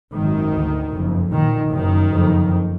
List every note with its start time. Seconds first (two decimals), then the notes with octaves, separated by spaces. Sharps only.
0.14 G#1 F#2 D#3
0.54 D2
0.93 F#1 F2
1.32 A#1 A#2 D#3
1.71 F#1 F#2 D#3
2.10 F#1 F2